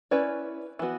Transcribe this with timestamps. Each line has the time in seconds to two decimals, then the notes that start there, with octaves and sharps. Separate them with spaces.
0.11 C#4 E4 B4 D5
0.79 E3 B3 F#4